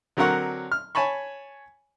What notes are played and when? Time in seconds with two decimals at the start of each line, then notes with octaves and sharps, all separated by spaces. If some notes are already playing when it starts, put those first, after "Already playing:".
0.17 D3 F#3 C4 A#4 F#5 C#6
0.72 F6
0.95 C#5 G#5 A5 B5 C#6